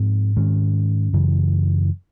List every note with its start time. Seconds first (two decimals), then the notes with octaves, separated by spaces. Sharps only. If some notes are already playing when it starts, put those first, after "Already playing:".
Already playing: G#2 F3 G#3 C4
0.36 G#2 D#3 G#3 C#4
1.13 F#2 C#3 E3